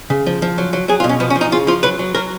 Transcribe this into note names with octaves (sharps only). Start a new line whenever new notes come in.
C#3
F3
F3
F#3
F#3
F#3 G#4
F4
B2
C#4
F3 B3
C#4
F3
D#4
C#3 F4
F3 F4
F#3 B4
F#3
F#3 A#4